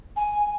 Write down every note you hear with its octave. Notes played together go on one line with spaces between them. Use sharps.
G#5